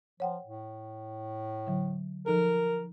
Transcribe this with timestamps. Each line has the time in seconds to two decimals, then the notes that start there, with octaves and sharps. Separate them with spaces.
0.20 F3 C#5 F#5 G5
0.44 A2
1.67 D3 F#3
2.26 F3 D#4 A4 A#4